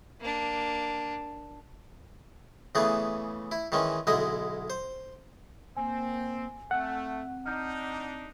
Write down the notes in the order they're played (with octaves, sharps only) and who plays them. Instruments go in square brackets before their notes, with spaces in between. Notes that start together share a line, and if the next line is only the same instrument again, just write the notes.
[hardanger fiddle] A#3 D4
[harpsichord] C#3 E3 A3 B3 G#4
E4
D#3 E3 G#3 C#4
B1 D3 G#3 E4 D#5
C5
[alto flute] A#3 [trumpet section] C4 [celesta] G#5
[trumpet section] A3 [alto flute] C4 [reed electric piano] F#5
[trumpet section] D4 D#4 [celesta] F6 G6